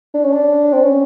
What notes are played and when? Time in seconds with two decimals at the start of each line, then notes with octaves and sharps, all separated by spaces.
0.14 D4
0.24 C#4
0.33 D4
0.73 C4
0.83 C#4